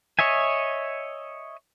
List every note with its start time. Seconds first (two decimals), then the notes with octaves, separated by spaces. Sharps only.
0.19 C#5 D#5 E5 G#5